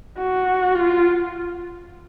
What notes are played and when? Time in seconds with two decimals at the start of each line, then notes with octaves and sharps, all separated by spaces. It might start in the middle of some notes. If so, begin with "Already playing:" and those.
0.18 F#4
0.75 F4